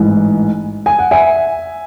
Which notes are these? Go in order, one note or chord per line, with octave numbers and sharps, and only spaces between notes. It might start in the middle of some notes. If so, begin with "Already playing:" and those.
Already playing: A1 G#2 E3
G#5
F#5
E5 G#5